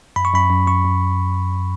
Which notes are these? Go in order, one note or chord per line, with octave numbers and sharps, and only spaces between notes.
F#2 B5
C#6
F#2 B5
F#2
F#2 C#6
F#2